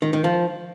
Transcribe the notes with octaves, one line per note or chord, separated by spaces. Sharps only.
D#3
D#3
F3